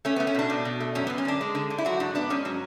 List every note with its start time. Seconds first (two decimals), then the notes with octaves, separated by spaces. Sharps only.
0.05 A3 C#4
0.16 A3 B3
0.27 C#4
0.35 B2 D4
0.50 B2
0.65 B2
0.80 A3
0.95 F#2 C#4
1.07 F#2 B3
1.18 C#4
1.25 D3 D4
1.41 G#3
1.55 D3
1.70 D3
1.78 E4
1.85 F#3 F#4
2.00 G#2 D4
2.15 B3 D4
2.30 G#2 C#4
2.45 F#3